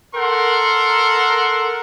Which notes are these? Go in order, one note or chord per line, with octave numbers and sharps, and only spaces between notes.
A4 A#4 F#5 C6